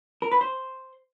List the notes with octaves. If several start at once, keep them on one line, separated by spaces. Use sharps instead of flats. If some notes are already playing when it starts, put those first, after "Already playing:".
A#4
B4
C5